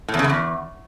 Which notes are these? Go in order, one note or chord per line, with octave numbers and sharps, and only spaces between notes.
A2
E2
C#3
F#2
E2